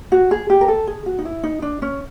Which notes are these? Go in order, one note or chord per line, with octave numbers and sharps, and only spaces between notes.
F#4
G#4
G4
A#4
A4
G#4
F#4
D#4
E4
D#4
D4
C#4